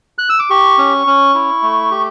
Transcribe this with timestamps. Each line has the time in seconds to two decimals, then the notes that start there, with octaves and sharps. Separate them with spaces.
0.18 F#6
0.30 E6
0.39 D6
0.50 G4 C#6
0.78 C#4
1.07 C#4
1.34 E4
1.62 A3
1.91 G4